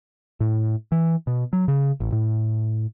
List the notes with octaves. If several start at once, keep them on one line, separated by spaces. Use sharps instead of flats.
A2
E3
B2
F#3
C#3
A1
A2